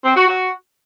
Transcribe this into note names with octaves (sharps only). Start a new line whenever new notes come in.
C4
F#4
F#4